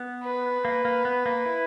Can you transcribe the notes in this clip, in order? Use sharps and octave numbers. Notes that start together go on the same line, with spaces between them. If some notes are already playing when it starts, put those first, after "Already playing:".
Already playing: B3
B4
A#3
A#3
B3
A#3
E4